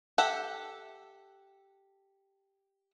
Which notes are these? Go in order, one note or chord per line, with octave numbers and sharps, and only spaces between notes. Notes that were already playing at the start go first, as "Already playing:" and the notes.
G4 A4 E5 F#5